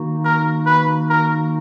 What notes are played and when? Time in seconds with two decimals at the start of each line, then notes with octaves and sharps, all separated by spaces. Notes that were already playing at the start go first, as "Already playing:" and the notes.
Already playing: D#3 A#3 D#4 F#4
0.24 A#4
0.66 B4
1.09 A#4